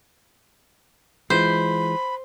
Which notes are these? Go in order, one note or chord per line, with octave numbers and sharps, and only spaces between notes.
E3 G#3 F4 C5 B5